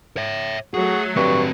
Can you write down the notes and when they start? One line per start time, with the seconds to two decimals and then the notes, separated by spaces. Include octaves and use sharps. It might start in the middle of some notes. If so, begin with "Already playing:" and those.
0.17 C#5 E5
0.74 F#3 A3 F#4 G#4
1.17 G2 C4 F#4 C#6